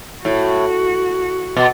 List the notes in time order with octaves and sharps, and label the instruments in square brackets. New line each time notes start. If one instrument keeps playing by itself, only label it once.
[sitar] A2 [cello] F#4
[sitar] B2